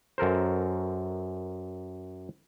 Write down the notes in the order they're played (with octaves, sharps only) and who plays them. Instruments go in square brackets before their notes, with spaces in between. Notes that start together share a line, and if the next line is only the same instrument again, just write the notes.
[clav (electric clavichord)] F#2 A4 A#4 C5